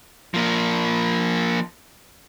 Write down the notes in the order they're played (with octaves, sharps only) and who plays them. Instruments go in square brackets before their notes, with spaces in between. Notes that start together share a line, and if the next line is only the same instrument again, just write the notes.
[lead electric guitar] F3 A#3